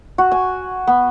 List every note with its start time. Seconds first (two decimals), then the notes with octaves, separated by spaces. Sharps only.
0.18 F#4
0.32 G#5
0.87 B3